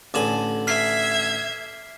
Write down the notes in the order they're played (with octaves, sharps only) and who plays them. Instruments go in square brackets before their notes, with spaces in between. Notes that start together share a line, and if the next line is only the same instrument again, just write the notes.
[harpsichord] A1 D3 G#5 [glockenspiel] D6 E7 F#7
[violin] E5 G#6 [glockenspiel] F6 B6 C7